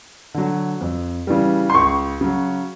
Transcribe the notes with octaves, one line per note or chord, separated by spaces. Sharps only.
D3 F#3
F2
C#3 E3 G3
C6
C#2 C#6
C#3 F#3